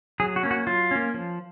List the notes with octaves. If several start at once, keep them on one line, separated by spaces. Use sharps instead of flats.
F#3 G#4
F#4
A#3 C#4
F#4
F#3 F4
A#3 C#4
F3